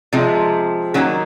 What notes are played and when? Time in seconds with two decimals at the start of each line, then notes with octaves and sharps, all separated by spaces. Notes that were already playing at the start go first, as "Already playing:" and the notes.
0.13 C3 F3 G#3
0.94 D#3 F#3 A#3 C#4